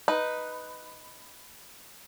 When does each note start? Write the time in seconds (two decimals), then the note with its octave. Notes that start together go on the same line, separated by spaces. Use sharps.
0.08 D#4 B4